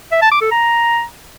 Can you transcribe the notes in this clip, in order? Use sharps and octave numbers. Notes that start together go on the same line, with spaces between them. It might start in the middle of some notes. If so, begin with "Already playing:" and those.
E5
A5
D6
A4
A#5